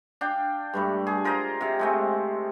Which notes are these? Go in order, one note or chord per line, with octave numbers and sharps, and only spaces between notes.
D4 F5 G5
G2 G3 A3
G#4
F4 A#4 C5 D#5
C3 F5
G#3 A3 C4